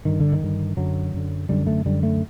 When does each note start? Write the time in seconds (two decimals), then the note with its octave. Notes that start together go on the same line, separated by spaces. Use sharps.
0.05 G2 D3 D#3
0.20 D3
0.33 D#3
0.42 G2 D3
0.77 F#2 D3 F#3
1.14 F#2 D3
1.49 F#2 D3 G3
1.67 A3
1.85 F#2 D3 G3
2.03 A3